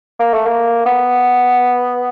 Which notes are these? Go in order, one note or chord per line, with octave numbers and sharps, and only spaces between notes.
A#3
A3
A#3
B3